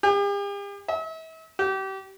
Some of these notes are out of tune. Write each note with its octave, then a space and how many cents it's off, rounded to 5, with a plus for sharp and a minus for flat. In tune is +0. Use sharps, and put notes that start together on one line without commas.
G4 +45
E5 -40
G4 -30